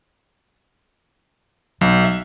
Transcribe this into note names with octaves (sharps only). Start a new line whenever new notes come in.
B1 F#3
E5